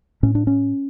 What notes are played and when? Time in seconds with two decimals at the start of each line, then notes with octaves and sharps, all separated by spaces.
0.23 A2 C#4
0.35 D4
0.47 C#4